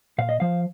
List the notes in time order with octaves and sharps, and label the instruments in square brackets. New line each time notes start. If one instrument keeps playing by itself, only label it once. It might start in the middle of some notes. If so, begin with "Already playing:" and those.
[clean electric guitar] A#2 F5
D#5
F3 F5